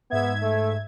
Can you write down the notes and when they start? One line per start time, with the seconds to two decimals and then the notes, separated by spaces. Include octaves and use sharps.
0.10 G#2 B3 E5 G#6
0.42 A3